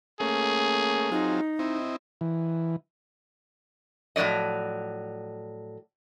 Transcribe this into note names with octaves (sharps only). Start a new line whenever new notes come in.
A3 A#3 C#4 G#4
F#3 C4 D#4 F4
C4 E4 D#5
E3
A2 F3 F#3 D5 D#5